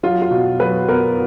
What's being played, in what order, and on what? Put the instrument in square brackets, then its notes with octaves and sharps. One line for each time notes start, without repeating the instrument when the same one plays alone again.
[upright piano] F#3 F4
F4
B2
F#3 B4
B3 A#4